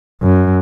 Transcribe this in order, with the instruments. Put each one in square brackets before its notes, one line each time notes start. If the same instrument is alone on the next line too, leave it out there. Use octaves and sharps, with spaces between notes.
[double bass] F#2